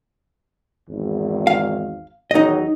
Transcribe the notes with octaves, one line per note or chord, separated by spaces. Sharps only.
G#1 E2
F5
E2 D#3 F#3 D#4 D#5